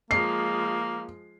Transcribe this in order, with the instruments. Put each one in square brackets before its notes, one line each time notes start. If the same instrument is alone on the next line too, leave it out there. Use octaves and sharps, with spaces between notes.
[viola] F3 G#3 [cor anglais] A#3 [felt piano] C7